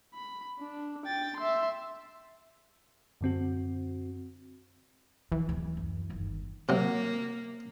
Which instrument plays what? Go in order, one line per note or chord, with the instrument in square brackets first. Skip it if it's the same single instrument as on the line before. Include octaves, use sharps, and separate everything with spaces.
[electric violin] B5
D4
G5 A6
E5 C6
[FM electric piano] F#2 D3 C4 F#4
[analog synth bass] E2 [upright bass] F3
[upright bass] D1
F#2
G1 D#3
[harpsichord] C3 F#3 [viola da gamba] A#3